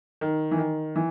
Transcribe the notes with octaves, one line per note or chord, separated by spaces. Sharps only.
D#3
E3
D#3
E3